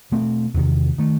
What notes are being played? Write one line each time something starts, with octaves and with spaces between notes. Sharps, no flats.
B2 A3 C4
E2 C3 D#3
D#3 A3